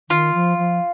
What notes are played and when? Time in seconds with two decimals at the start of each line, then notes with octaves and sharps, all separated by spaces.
0.10 D#3 F4
0.34 F3
0.58 F3